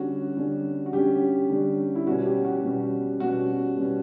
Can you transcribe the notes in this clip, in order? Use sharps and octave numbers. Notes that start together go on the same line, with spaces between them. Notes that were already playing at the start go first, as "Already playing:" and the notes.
Already playing: D3 G3 C#4 F#4
D3 G3 C#4
F#4
D3 G3 C#4 G4
D3 G3 C#4
E4
B2 G3 C#4 F#4
G4
F#4
B2 G3 C#4
B2 G3 C#4 F#4
B2 G3 C#4